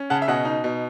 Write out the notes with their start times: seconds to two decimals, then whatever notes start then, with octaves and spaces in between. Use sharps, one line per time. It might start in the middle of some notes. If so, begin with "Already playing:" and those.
Already playing: C#4
0.10 C#3 F#5 A5
0.22 E5
0.28 B2 D#5 F#5
0.45 D#4
0.64 B2